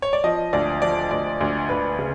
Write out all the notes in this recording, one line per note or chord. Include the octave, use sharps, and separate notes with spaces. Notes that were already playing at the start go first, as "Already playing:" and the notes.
C#5
D5
F3 D#5
D2 D5
F3 D5
D2 D5
D2
D2 B4
C#3